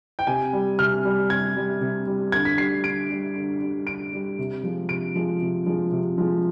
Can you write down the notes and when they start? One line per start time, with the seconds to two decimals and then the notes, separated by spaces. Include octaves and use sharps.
0.19 G5
0.27 C3 G#5
0.53 G3
0.79 C3 F6
1.05 G3
1.30 C3 G#6
1.56 G3
1.81 C3
2.07 G3
2.32 D3 G#6
2.45 B6
2.58 G3 C7
2.84 D3 D7
3.10 G3
3.36 D3
3.60 G3
3.86 D3 D7
4.13 G3
4.39 C3
4.63 F3 G#3
4.89 C3 D7
5.15 F3 G#3
5.41 C3
5.66 F3 G#3
5.92 C3
6.18 F3 G#3